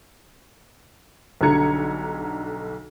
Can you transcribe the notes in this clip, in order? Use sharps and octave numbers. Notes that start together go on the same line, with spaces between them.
B1 D3 G3 A#5 G#6 C#7